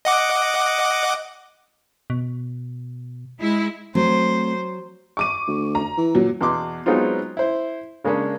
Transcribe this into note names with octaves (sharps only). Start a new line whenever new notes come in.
D#5 F#5 D6
B2
G#3 E4
F#3 A3 C4 C5
C#6 D6 D#7
D2
A#5
E3
A#2 F#3
E2 B2 C6 D6
F#3 G#3 B3 C4 D#4 F4
E4 C5
C#3 G#3 A#3 C#4 D4